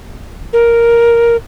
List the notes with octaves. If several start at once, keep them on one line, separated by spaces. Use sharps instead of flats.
A#4